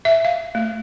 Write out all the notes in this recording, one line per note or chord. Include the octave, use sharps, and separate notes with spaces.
E5
F5
A3